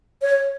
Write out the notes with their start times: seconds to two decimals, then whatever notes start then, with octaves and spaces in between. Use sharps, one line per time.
0.22 C#5